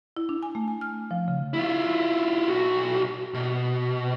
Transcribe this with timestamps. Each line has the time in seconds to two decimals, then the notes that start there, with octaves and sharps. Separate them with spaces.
0.17 E4
0.29 D4
0.43 G#5
0.55 A3
0.68 G#5
0.81 F6
1.11 F3
1.28 C#3
1.54 E4 F4
2.48 B1 F#4
3.34 B2